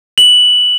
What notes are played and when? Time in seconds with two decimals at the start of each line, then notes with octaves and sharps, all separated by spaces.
0.18 F#7